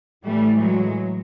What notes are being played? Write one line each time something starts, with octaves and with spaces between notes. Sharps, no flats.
A2 E3 G3 A3
F#3 G#3